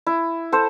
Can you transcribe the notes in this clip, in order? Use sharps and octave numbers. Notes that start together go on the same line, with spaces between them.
E4
A4 C5